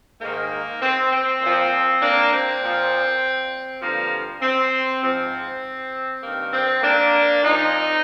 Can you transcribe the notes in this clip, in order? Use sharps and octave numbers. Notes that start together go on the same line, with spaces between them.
G#2 D#3 A#3
C4
C4
A#2 F3
A#3 D4
C4
A#2 F3
G2 D3 F3 A#3
C4
G#2 F3 C4
G2 D#3 A#3
C4
A#3 D4
A#2 F3 C4 D#4